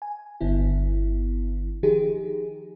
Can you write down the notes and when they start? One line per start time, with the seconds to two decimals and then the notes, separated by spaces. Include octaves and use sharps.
0.02 G#5
0.41 G1 D3 B3 E4
1.83 D#3 F3 D#4 G4 G#4